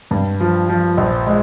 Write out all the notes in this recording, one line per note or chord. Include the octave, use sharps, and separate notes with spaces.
G2
F3
F3
A#1
G#3